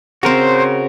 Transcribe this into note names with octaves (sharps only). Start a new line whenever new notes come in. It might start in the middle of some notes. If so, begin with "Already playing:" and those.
C#3 C4 F#4 A#4 C5